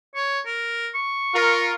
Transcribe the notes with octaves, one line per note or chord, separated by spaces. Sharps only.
C#5
A#4
C#6
F4 A#4